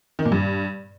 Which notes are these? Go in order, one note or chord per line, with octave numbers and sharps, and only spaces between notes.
D#3
A#2
G2